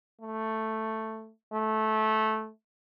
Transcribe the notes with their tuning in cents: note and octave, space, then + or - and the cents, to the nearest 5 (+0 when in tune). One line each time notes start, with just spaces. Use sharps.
A3 +5
A3 -15